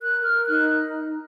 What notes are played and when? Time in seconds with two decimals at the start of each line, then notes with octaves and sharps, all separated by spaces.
0.01 A#4 F#6
0.24 A#4 F6
0.48 D#4 F#6